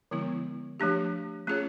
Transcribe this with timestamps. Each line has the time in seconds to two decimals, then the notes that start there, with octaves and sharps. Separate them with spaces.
0.11 D3 F3 G#3 B3 E4
0.80 F3 A3 D4 G4
1.47 A3 C#4 F4 G#4 C#5